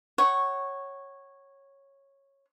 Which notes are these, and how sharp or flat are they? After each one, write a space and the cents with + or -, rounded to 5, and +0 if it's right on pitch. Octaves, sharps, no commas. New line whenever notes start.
C#5 -10 F#5 +30 C#6 +0